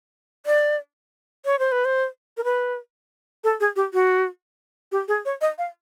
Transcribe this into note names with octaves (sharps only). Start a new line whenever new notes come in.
D5
C#5
C5
B4
C5
A#4
B4
A4
G#4
G4
F#4
G4
G#4
C#5
D#5
F5